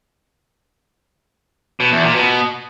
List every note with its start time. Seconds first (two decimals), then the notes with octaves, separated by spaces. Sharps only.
1.80 B2
1.92 E2
2.04 A#2
2.16 B2